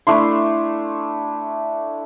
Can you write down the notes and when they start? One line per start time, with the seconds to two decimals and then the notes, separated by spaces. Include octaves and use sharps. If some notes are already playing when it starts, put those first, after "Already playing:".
0.07 A3 D4 E4 C6